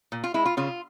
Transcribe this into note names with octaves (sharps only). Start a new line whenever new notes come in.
A#2
F4
G#3 E4
F4
C#3 F4